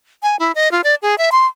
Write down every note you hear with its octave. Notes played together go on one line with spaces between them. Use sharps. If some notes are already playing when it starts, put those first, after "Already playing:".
G#5
E4
D#5
F4
D5
G#4
E5
C6